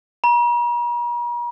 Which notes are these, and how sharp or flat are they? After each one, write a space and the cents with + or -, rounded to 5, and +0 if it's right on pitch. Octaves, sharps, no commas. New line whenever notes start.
A#5 +45